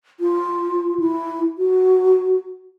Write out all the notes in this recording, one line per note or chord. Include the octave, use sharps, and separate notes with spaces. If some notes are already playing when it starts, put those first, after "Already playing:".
F4
E4
F#4